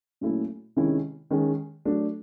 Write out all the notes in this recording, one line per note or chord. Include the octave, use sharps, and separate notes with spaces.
A#2 F#3 A3 C#4 E4
C3 D#3 G#3 C#4 E4
D#3 G#3 C#4
F#3 A3 D4